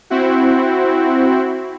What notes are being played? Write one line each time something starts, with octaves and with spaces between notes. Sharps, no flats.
C4 E4 F#4